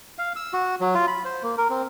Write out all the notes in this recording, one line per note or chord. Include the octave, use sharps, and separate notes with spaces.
F5
E6
F#4
F#3
F4
B5
C5
A#3
A#4
C4